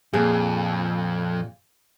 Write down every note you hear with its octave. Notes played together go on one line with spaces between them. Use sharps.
F2 A#2 G#4